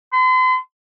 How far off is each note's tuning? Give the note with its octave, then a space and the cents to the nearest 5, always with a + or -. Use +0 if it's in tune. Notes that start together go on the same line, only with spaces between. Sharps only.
C6 -40